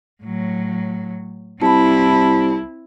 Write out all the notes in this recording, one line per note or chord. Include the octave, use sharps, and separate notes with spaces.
A2 F#3
C2 C4 E4 A5 B5